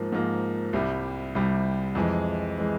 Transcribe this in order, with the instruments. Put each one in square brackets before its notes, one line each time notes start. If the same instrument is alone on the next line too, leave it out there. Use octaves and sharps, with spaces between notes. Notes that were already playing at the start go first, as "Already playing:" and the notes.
Already playing: [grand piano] G#2 F3 A#3
G#2 F3 A#3
C2 C3 G3
C2 C3 G3
F2 E3 G#3
E3 G#3